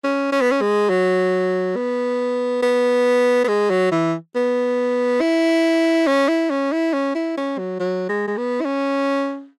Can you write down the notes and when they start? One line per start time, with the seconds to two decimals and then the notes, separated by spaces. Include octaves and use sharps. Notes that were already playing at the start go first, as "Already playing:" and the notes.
0.04 C#4
0.32 C#4
0.41 B3
0.51 C#4
0.61 G#3
0.90 F#3
1.76 B3
2.62 B3
3.44 B3
3.48 G#3
3.70 F#3
3.91 E3
4.35 B3
5.21 E4
6.07 C#4
6.28 E4
6.50 C#4
6.72 E4
6.93 C#4
7.15 E4
7.37 C#4
7.58 F#3
7.80 F#3
8.09 G#3
8.27 G#3
8.37 B3
8.61 E4
8.65 C#4